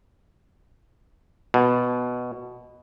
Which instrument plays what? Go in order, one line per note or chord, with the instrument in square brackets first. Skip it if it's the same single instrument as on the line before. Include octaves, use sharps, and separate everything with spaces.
[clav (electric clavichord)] B2